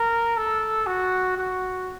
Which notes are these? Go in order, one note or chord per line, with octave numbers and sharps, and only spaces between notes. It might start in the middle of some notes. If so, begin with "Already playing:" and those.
Already playing: A#4
A4
F#4
F#4